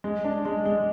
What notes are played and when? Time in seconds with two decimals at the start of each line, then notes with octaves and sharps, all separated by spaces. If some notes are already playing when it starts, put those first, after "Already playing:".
0.04 G#3
0.24 D4
0.45 G#3
0.65 G#3